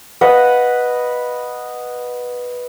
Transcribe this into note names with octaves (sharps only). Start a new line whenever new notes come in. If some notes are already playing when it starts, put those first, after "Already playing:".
B4 D#5 F5 F#5